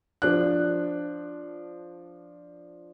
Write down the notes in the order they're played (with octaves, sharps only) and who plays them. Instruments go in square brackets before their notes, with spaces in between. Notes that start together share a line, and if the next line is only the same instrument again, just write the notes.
[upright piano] F3 D4 F#6